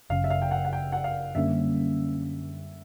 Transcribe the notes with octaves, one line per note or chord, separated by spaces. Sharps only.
G1 F#2 C#3 F5
E5
F5
G5
F#5
F#5
G5
F#5
F5
F#2 D3 G3 A#3 C#4 E5